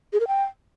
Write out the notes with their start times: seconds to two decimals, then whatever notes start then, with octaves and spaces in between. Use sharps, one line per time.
0.13 G#4
0.20 A#4
0.28 G5